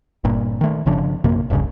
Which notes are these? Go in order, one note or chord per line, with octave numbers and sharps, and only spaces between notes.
G1 G2 A#2
D#3 A3
G1 C#3 F3 D4
A#1 F#2 C3 A#3
E1 C2 G2 C#3